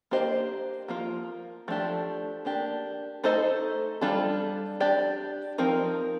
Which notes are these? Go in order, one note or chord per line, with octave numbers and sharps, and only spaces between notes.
A#3 D4 G4 C5 D#5
F3 A#3 F4 A#4
F3 A3 D4 G4
A#3 D4 G4
A3 D#4 A4 C5 D#5
G3 D4 F4 A4
D4 G4 D5
F3 C4 D#4 A#4